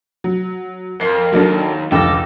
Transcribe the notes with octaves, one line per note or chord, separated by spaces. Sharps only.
F#3
F2 A#4 C7
D#2 F#3 D4 A4
F1 C#2 D3 A4 G5 D6 A#6